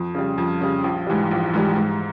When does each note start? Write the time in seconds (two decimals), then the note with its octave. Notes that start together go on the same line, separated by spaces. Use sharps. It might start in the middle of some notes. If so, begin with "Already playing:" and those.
Already playing: F2
0.15 C#3 G3
0.38 F2
0.61 C#3 G3
0.84 A#1
1.07 G#2 E3 G3
1.31 A#1
1.54 G#2 E3 G3
1.77 G#2